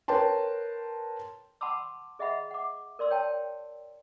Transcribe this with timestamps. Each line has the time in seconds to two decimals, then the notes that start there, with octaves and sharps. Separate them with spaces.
0.08 A#4 B4 C#5 G5 A5 C6
1.61 F#5 A5 B5 C6 D6 E6
2.19 G#4 D#5 E5 F#5 B5
2.51 F#5 D6
2.99 A#4 D5 C6 E6
3.10 C#5 G5 A5